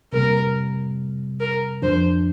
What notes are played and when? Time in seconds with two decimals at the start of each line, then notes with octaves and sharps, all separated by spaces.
0.13 C3 G3 A#3 A#4
1.40 A#4
1.82 F2 F3 D4 C5